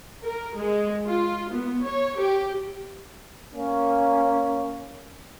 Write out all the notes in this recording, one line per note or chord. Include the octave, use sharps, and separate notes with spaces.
A#4
G#3
F4
B3
C#5
G4
A#3 C#4